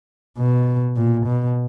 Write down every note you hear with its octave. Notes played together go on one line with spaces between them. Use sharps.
B2
A#2
B2